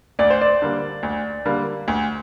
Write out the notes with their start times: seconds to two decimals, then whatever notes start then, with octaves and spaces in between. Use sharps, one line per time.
0.19 D2 D5
0.30 C5
0.41 D5
0.62 D3 G3 A#3
1.03 D2
1.45 D3 G3 A#3
1.88 D2